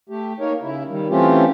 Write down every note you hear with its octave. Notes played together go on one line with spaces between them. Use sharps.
A3 G4
A#3 D#4 A#4 C#5
C#3 E4
D#3 G3
E3 A3 C4 C#4 F4 G4